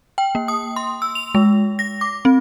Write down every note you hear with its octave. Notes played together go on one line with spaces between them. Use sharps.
G5
A#3
D#6
C6
E6
F7
G#3
A#6
D6
C4